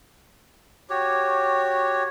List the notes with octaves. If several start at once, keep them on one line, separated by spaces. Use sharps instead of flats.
F#4 G4 C#5